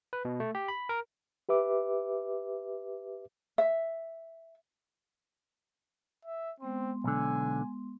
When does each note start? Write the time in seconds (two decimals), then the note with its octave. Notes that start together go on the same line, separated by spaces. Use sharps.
0.13 B4
0.25 B2
0.40 A3
0.55 G4
0.68 B5
0.89 A#4
1.49 G4 B4 E5 D6
3.58 E5
6.25 E5
6.60 G#3 B3 C4 C6
7.04 B1 D3 G#5